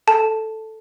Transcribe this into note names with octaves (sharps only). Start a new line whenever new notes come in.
A4 A5